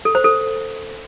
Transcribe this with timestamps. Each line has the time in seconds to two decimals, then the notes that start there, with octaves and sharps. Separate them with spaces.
0.05 A4
0.15 C5
0.24 A4